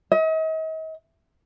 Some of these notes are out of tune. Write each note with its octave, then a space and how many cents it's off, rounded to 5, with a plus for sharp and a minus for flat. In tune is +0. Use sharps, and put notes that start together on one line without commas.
D#5 +40